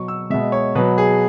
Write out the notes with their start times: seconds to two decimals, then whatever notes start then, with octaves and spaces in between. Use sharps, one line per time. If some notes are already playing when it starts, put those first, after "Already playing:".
Already playing: B2 F#3 C#6
0.08 E6
0.30 B2 G#3 E5
0.52 C#5
0.75 B2 F#3 B4
0.98 G#4